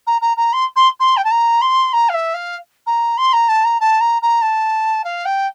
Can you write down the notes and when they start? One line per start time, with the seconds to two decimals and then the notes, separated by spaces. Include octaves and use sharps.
0.07 A#5
0.21 A#5
0.37 A#5
0.53 C6
0.76 C6
1.00 C6
1.17 G5
1.24 A5
1.31 A#5
1.61 C6
1.93 A#5
2.09 F5
2.14 E5
2.34 F5
2.86 A#5
3.17 C6
3.33 A#5
3.49 A5
3.64 A#5
3.80 A5
4.00 A#5
4.22 A#5
4.42 A5
5.04 F5
5.25 G5